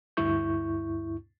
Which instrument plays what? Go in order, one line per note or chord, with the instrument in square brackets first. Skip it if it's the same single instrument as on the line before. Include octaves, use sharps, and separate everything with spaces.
[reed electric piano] D2 G2 E4 C#6 G6